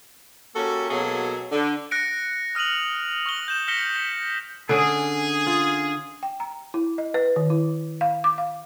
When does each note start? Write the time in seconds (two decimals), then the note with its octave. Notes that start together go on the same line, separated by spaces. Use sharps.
0.56 A#3 C#4 F#4 G4 A4
0.90 B2 F#3 A#3 G#4 A4
1.52 D3
1.91 F#6 A#6 C#7 D7
2.55 D#6 F6 D#7 F7 F#7
3.26 C#6 F6 G7
3.48 G6 E7
3.68 F6 A#6 B6 C#7 E7 G7
3.96 B6
4.69 D3 C#4 G#4
5.47 F4
6.23 G5
6.40 A#5
6.74 E4
6.98 D#5
7.14 B4
7.36 D#3
7.50 E4
8.01 F5
8.24 D6
8.38 F5